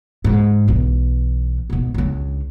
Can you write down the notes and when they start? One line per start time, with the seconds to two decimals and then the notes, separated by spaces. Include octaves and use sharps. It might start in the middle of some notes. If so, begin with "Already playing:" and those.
0.24 G#2
0.68 B1 E3
1.70 G#2 B2
1.94 C#2 D4